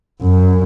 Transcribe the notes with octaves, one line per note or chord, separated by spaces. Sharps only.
F#2